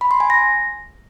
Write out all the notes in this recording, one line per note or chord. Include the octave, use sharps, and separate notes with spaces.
B5
C6
G#5
A#6